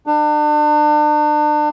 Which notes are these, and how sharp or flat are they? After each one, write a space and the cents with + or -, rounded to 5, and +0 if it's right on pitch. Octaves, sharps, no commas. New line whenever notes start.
D4 +35